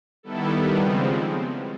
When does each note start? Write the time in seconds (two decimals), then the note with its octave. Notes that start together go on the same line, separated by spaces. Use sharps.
0.23 D#3 G3 B3 E4 A4
0.52 D#3 G3 B3
0.79 C#3 F3 G#3 C4